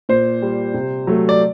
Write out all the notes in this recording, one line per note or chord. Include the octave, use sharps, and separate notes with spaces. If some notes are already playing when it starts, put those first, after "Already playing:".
A#2 C5
G3
C3
F#3 A3
D5